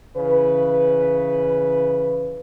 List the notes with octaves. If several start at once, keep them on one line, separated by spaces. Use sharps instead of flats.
C#3 E3 B4